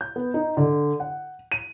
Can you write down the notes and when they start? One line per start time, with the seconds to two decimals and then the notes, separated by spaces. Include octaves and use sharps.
0.01 G6
0.16 B3
0.34 D#4
0.57 D3
1.00 F#5
1.52 D#7